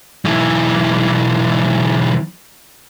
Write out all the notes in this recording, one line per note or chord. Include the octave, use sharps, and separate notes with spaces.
B1 E3